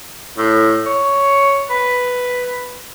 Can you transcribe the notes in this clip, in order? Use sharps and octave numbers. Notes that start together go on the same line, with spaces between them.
A2
C#5
B4